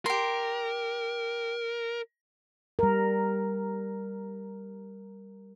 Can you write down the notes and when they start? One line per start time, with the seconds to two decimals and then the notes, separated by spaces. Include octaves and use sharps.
0.06 G4 A#4 C6
2.79 G3 A#4